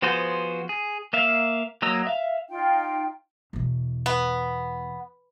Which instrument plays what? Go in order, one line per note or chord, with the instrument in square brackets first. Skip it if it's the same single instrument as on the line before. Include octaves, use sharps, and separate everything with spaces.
[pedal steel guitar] F3 B3 F#4 G#4 C5
G#4
A#3 E5 F5
F#3 A#3 D#5 A#5 E6
E5 F5
[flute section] D#4 F4 G5
[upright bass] E2 B2
[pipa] B3